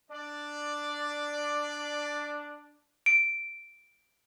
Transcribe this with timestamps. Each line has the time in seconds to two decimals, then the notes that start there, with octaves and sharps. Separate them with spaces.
0.11 D4 D5
3.06 D7